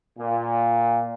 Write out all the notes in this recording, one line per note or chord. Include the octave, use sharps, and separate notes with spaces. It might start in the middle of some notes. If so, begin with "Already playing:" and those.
A#2